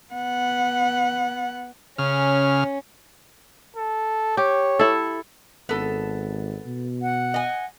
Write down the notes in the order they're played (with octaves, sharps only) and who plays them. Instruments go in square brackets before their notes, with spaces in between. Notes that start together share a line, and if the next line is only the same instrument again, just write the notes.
[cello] B3 F#5
[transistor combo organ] C#3 F6 [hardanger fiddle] C#4
[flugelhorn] A4
[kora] G4 [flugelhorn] C#5
[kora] E4 A4
[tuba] G#1 [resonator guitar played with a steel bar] B3 A4
[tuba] B2
[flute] F#5
[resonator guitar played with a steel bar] D#5 G#5